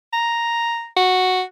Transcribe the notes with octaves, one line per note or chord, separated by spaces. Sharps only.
A#5
F#4